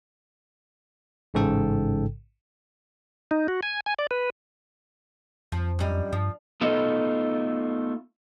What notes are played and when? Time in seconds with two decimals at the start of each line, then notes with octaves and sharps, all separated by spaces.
1.34 A1 G#2 C#3 A4 G5
3.31 D#4
3.48 F#4
3.63 G#5
3.86 G#5
3.99 D5
4.11 B4
5.52 F2 F3
5.79 F#2 G3 D#5
6.13 G2 F3
6.61 A3 B3 D#4 F4 A4 D#5